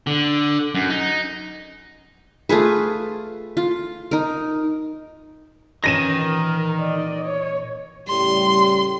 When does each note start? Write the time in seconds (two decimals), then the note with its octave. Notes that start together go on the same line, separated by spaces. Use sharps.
0.07 D3
0.75 F#2
0.90 D#4
2.49 A3 F4 G#4 B4
3.57 F4
4.11 D#4 A#4
5.84 A#2 D#3 E3 A#3 C#4 A#6 D#7 E7
6.18 A#4
6.79 D5 D#5
7.26 C#5
8.08 A2 C#3 G3 C6